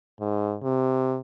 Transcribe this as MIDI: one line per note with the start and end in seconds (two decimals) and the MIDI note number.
0.20 0.56 44
0.63 1.18 48